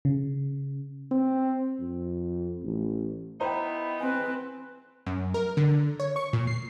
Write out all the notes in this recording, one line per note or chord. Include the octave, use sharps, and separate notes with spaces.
C#3
C4
F2
A1
B3 D#4 E4 C5 G5 A#5
C4 B4 G#5
F#2
A#4
D3
C#5
C#6
A#2
C7